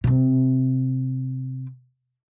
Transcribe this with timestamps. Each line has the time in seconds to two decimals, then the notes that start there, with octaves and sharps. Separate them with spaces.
0.04 C3 C4